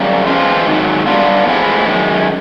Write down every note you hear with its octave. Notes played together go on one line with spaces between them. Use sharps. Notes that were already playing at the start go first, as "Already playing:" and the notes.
Already playing: F#2 C#3 G3 A#3
E3 G#3 C4 F4
G#2 D#3 F#3
D3 G3 B3 D4 F4
A2 F3 G#3 B3 E4
F#2 D#3 G#3